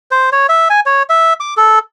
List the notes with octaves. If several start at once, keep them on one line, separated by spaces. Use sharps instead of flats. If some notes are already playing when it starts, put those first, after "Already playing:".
C5
C#5
E5
G#5
C#5
E5
D6
A4